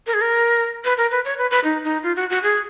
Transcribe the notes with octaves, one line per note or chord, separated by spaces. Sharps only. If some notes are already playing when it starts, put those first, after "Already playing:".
A#4
G#4
A#4
B4
A#4
B4
C#5
B4
B4
D#4
D#4
F4
F#4
F#4
G#4